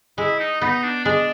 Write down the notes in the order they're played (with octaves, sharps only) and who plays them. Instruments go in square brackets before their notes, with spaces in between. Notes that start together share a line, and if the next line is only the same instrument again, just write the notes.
[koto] G#3 [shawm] E4
[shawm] D#4
[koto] B3 [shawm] D#4
[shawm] D4
[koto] G#3 [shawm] D4